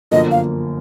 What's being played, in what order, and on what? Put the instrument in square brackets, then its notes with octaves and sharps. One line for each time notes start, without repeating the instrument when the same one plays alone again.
[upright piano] G1 F#2 D3 F3 A#3 [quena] D#5
[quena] F5